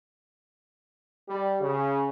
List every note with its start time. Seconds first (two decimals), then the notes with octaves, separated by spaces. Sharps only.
1.27 G3
1.59 C#3